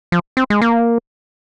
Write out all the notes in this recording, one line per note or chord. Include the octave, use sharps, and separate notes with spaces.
F3
C4
G#3
A#3